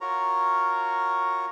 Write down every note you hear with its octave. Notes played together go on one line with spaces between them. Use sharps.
F4 F#4 A#4 C#5 A#5